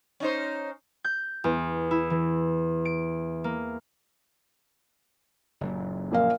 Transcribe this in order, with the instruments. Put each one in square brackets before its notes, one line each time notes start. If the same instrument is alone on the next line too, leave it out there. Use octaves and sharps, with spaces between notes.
[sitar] C#4 D#4 C5
[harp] G6
E2
E4
E3
D7
A#3
[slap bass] F#1 A#2
[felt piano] A#1 A#3 F5